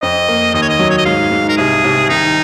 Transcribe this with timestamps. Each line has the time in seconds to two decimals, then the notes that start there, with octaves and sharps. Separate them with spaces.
0.02 F2 D#5
0.28 A#3
0.54 D#2 D#5
0.62 C#5
0.69 D#5
0.80 F#3
0.90 C#5
0.98 D#5
1.05 G#2 F5
1.31 G#2
1.49 A#4
1.57 C2 G#4
1.84 C2
2.09 D#3 D#4